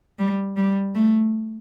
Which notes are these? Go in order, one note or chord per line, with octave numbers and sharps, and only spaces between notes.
G3
G3
A3